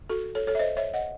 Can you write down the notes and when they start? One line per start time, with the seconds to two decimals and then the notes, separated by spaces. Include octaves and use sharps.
0.09 F#4 A4
0.35 A4 C#5
0.47 A4 C#5
0.55 E5
0.59 C5 D#5
0.77 C#5 E5
0.94 D#5 F#5